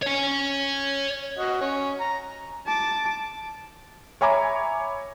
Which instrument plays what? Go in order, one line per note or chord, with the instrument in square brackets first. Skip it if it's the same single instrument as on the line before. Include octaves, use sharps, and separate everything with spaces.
[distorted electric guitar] C#5 G#5
[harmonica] F#4 D#5
C#4
A#5
[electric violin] A5 D6
[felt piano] C#5 E5 G#5 A#5 B5 D6